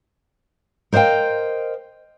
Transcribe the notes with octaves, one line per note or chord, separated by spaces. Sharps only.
A#4 C5 D#5 F5 G5